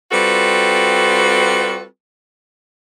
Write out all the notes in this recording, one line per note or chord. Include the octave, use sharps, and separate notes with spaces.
G3 C4 F4 F#4 A4 B4